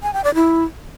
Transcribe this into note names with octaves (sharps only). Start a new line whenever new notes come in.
G#5
G5
D5
E4